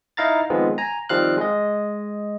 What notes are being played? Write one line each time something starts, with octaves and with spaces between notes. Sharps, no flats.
D#4 E4 F5 A#5 A6
D#3 F3 G#3 B3 C4
G#5 A#5
D#3 F3 G3 C4 F5 F#6
G#3 D#5